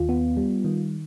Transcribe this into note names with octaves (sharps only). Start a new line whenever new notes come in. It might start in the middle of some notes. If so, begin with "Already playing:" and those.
Already playing: D#2 F4
B3
G3
D#3